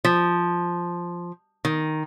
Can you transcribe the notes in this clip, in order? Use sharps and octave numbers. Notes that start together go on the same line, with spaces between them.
F3
D#3